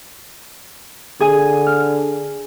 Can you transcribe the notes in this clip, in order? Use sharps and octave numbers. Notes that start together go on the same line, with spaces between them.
D3 G#4 G#5 D#6
F6